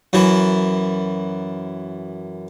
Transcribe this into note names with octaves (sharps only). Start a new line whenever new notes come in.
F#2 E3